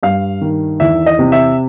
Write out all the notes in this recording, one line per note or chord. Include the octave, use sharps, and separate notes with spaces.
G2 F5
D#3
E2 E5
D#5
C3
E5